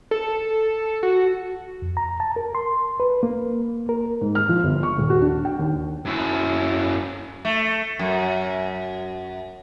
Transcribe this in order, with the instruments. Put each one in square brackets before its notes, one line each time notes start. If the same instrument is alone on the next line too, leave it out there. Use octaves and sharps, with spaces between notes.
[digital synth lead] A4
F#4
[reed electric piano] F2
A#5
A5
A#4
C6
B4
A#3
A#4
[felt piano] G#2
F6
F3
G1
C#6
D#1
F#4
D4
G5
D#2
[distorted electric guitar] F#2 E4
[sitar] A3
F#2